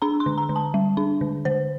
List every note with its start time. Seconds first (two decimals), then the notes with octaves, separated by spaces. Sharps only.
0.02 D4 A#5
0.20 C6
0.26 D3
0.38 A#5
0.49 D3
0.56 A5
0.74 G3
0.97 D4
1.21 D3
1.45 D3 C5